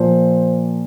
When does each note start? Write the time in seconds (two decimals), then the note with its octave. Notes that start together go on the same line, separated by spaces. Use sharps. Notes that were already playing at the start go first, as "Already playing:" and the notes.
Already playing: A#2 F3 C5